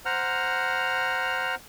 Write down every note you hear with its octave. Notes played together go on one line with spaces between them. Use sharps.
C5 F#5 A#5 F6